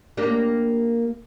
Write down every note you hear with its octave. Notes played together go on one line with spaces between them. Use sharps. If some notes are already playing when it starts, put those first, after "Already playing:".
A#3 D4 G4